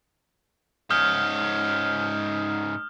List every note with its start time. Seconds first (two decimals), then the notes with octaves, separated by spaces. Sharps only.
0.90 G#2 C#4 D#6 F6 G6